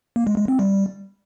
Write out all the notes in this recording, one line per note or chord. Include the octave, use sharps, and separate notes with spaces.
A#3
G#3
G#3
C4
G3